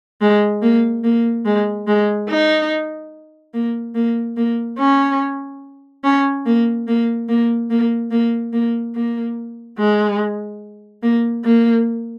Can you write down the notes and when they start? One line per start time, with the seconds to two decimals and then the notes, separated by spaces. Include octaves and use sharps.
0.21 G#3
0.62 A#3
1.04 A#3
1.45 G#3
1.87 G#3
2.29 D#4
3.54 A#3
3.95 A#3
4.37 A#3
4.79 C#4
6.04 C#4
6.46 A#3
6.87 A#3
7.29 A#3
7.70 A#3
8.11 A#3
8.53 A#3
8.96 A#3
9.79 G#3
11.03 A#3
11.45 A#3